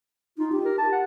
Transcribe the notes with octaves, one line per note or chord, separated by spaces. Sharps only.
D#4 F4
G4
A#4
A5
F#5